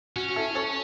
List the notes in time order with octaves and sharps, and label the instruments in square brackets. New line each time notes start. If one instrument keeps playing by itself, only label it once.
[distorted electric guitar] C#4 [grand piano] F#4
[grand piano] F#4
E4 A4
A4 C#5